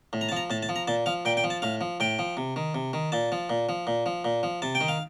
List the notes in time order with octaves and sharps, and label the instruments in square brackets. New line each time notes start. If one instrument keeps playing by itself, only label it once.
[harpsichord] A2
A#5
A5
F3 A#5
A2 A5
A5
F3
A#5
A#2 A5
F3 F5
A#2 G5
G5
F3
A5
A2 F5
F3
A2 G5
F3
C3
D#3
C3
D#3
A#2 A5
F3
A#2
F3
A#2
F3
A#2
F3
C3 A5
G5
D#3
F5